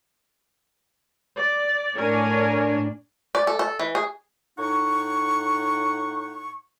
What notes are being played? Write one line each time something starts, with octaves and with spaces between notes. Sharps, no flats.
D5
A2 D4 A#4 C#5 G#5
D5
A4
A4
E3
G#4
A2 D#4 F#5 C#6